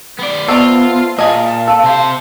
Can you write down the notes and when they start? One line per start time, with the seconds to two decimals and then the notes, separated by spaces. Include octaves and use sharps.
0.19 B3 D5
0.49 A3 B3 C4 F4 D5
1.19 A#2 G#4 D#5 F5 A5
1.68 A4
1.84 C3 C5